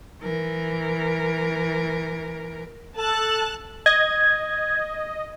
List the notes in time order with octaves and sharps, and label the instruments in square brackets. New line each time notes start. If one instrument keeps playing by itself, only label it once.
[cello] E3 A#4
[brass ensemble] A4 [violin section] A5 F#6
[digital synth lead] D#5 [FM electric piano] G#6